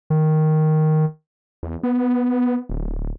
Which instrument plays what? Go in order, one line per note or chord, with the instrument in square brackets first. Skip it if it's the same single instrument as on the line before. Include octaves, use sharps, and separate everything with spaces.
[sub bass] D#3
[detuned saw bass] E2
B3
D1